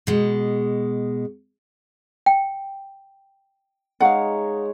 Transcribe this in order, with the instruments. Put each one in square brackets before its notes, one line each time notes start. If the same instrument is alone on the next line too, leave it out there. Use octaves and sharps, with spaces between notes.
[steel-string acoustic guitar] B2 G#3
[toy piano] G5
[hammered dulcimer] G#3 D#4 C#5 [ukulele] F5 F#5